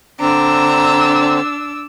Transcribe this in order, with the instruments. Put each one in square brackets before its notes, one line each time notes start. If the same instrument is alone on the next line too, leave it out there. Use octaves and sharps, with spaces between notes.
[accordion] D3 C4 [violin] D4 E6 [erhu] A#5